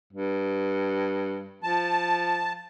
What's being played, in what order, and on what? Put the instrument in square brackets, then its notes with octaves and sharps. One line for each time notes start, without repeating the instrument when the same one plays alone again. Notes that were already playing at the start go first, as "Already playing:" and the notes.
[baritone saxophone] G2
[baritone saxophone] F3 [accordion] A5